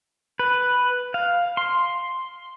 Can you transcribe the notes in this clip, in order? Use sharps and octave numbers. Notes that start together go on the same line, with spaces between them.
B4
F5
C6